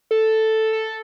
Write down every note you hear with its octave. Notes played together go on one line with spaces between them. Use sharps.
A4
A4